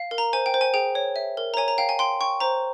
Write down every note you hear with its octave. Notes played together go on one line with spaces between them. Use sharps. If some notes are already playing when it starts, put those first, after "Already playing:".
Already playing: F5
A#4
A#5
C5 G#5
G5
C5
G#5
G#4 G5
C#5
E5
A#4
A#5
C#5 G#5
A#5
F5 G5
G#5
G5 C6
G5 C#6
C5 A#5